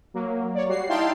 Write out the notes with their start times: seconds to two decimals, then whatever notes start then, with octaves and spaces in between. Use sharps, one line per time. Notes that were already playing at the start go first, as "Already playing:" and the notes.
0.14 F#3 A#3
0.55 C#5 D5
0.68 G3 F#4 C7
0.89 D#4 E4 F5 G5 A5 C6